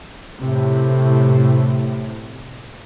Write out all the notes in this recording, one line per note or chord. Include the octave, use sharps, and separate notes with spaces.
A2 C3